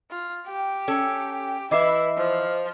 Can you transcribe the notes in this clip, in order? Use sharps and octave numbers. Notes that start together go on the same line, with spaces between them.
F4
G4 G5
C#4 A4
E3 E4 B4 D#5 E5 D6 C7
F3 C5